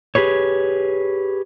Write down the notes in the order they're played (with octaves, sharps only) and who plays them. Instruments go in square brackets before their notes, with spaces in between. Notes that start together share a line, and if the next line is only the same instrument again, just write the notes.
[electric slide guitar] G4 G#4 B4 C#5